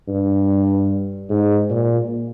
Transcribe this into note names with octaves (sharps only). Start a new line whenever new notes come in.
G2
G#2
A#2